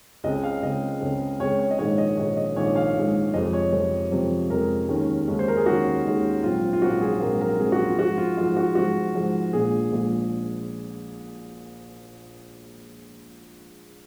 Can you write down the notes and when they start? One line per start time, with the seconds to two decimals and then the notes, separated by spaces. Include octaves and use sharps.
0.24 C#2 C#3 G#3 C4 D#5
0.44 F5
0.62 C#2 C#3 G#3 C4 D#5
1.01 C#2 C#3 G#3 C4
1.40 C#2 C#3 G#3 C4 C#5
1.59 C#5
1.71 D#5
1.79 A#1 G#2 D#3 G#3 C#5
1.98 D#5
2.17 A#1 G#2 D#3 G#3 C#5
2.37 D#5
2.56 A#1 G#2 D#3 G#3 C#5
2.76 F5
2.95 A#1 G#2 D#3 G#3
3.34 F2 C3 F3 G#3 D#5
3.53 C#5
3.72 F2 C3 F3 G#3
4.11 F2 C3 F3 G#3
4.49 F2 C3 F3 G#3 A#4
4.88 D#2 D#3 G#3 C#4
5.27 D#2 D#3 G#3 C#4
5.39 C5
5.48 A#4
5.57 G#4
5.66 D#2 D#3 G#3 C#4 F#4
6.05 D#2 D#3 G#3 C#4
6.43 A#1 G#2 F#3 C4 F4
6.73 F4
6.82 A#1 G#2 F#3 C4 F#4
7.01 G#4
7.21 A#1 G#2 F#3 C4 A#4
7.41 A#4
7.60 A#1 G#2 F#3 C4 G#4
7.72 F#4
7.85 F4
7.98 G#2 F3 G#3 F#4
8.18 F4
8.37 G#2 F3 G#3 F4
8.57 F#4
8.75 G#2 F3 G#3 F#4
9.15 G#2 F3 G#3
9.53 A#1 A#2 G#3 G#4
9.92 A#1 A#2 G#3